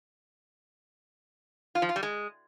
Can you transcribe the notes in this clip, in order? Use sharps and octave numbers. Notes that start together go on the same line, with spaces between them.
F4
F3
F4
G3
G#3